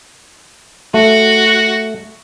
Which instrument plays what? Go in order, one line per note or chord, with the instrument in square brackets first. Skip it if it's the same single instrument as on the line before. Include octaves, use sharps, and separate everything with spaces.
[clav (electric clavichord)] A3 [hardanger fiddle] F#4